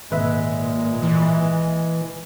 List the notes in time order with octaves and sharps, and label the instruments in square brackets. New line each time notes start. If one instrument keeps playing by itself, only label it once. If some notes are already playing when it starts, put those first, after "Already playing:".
[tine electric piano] G#1 B4 E5 [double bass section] A#2 [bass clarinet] G#3
[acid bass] E3